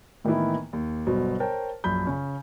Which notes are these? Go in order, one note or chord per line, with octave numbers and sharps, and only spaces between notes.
A2 D#3 E3 A#3 B3 E4
D#2
G1 B2 F#3 C5
A#4 C5 C#5 G5 A5
A#1 F#2 B5 G6
C#3 C#4